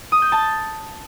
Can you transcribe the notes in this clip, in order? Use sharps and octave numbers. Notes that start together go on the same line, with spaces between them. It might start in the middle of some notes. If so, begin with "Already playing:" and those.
D#6
G6
A5